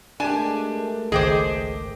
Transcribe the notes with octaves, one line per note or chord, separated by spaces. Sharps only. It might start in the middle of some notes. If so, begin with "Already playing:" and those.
G#3 A3 D4 G4 A#4 G#5
G#1 C#2 D#3 G#4 C5 D#5 G5 D6